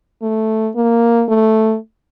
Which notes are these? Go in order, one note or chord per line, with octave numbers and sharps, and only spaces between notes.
A3
A#3
A3